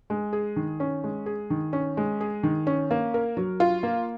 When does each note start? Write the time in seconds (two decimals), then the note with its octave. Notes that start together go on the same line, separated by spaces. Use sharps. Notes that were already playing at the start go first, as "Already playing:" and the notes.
0.10 G#3
0.33 G#4
0.56 D#3
0.80 C#4
1.04 G#3
1.26 G#4
1.50 D#3
1.73 C#4
1.97 G#3
2.21 G#4
2.43 D#3
2.67 C#4
2.91 A#3
3.14 A#4
3.37 F#3
3.60 F4
3.83 A#3